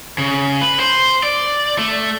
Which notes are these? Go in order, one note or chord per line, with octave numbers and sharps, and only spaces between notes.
C#3
B4
C5
D5
A3